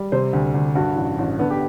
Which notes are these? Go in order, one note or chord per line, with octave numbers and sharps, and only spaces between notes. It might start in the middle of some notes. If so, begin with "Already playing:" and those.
Already playing: G3
C3 C5
D2
D2
G2 F#4
A1
A1
D3 B3
G4